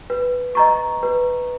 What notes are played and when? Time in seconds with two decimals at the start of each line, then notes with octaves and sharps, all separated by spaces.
0.10 B4
0.55 D#5 A#5 C#6
1.03 B4